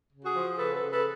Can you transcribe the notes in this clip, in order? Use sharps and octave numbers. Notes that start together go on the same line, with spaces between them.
C#3
F#4 G#4
F3
C#3 A4 B4
A4 B4
C#3
A4 B4